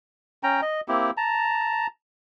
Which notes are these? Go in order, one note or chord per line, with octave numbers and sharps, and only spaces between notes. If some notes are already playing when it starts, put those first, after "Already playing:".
C#4 G5 A#5
D#5
A#3 C4 E4 G4
A5 A#5